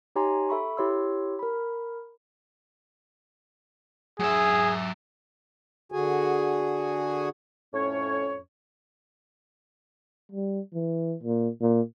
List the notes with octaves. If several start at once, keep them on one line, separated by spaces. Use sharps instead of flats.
D#4 G4 C#5 G#5 A#5 C6
A4 E5 B5 C#6
E4 G4 C#5 C6 E6
A#4 B5
F#3 G#4 E5
D3 F#4 G#4 G#5
F2 A2 C#4 C#5
G3
E3
A#2
A#2